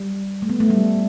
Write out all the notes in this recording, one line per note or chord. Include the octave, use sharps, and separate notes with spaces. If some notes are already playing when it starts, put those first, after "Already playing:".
Already playing: G3
A3
B3
A3
G3